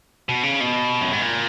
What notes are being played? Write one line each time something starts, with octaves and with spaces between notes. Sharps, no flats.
B2
C#3
B2
F#2
G#2
A#2